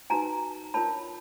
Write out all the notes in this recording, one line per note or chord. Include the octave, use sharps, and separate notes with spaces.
D#4 F#4 B4 G#5 A#5
D4 F4 A#4 C#5 A5 B5